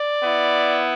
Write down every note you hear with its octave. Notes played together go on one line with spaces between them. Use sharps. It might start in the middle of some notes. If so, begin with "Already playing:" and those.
Already playing: D5
B3 E4